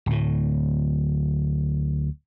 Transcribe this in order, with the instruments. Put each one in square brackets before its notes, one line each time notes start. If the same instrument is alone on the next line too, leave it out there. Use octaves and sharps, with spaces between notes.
[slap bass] D1 A2